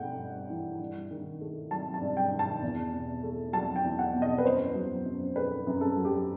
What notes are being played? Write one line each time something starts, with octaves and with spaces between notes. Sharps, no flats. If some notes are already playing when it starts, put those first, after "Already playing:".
Already playing: G2 A3 F#5 G5
G2
E3
G2
D#3
A3
F#3 A5
A5
G2
G5
D#3
A5
E2
B2
A3
F#3 A5
G5
E2
F#5
B2
D#5
B4
F#2 C5
F#3
F#2
A3 B4
F#2
A4
F#3
G4